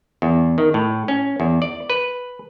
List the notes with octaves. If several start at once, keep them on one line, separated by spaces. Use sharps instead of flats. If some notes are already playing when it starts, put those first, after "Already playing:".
E2
D#3
A2
C#4
E2
D5
B4